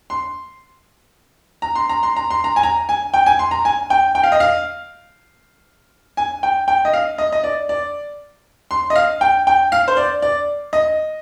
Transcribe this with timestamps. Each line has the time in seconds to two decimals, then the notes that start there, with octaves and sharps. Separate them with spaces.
0.10 C6
1.62 A#5
1.75 C6
1.89 A#5
2.03 C6
2.16 A#5
2.31 C6
2.44 A#5
2.56 G#5
2.63 A#5
2.89 G#5
3.14 G5
3.26 G#5
3.39 C6
3.51 A#5
3.65 G#5
3.90 G5
4.15 G5
4.23 F5
4.32 D#5
4.40 F5
6.17 G#5
6.43 G5
6.68 G5
6.85 D#5
6.93 F5
7.18 D#5
7.33 D#5
7.44 D5
7.69 D5
8.71 C6
8.90 D#5
8.96 F5
9.21 G5
9.47 G5
9.72 F5
9.88 C5
9.97 D5
10.22 D5
10.73 D#5